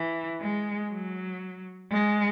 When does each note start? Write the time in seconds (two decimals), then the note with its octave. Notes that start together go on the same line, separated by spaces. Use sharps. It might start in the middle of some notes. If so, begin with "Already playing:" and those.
Already playing: E3
0.42 G#3
0.91 F#3
1.91 G#3